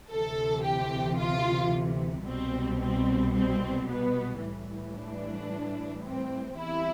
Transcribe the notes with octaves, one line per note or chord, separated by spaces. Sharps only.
D2 C3 E3 A4
G4
F4
C2 B2 G3 C4
C4
C4
B3
A2 E3 G3
D4
C4
E2 C3 E3 G3 E4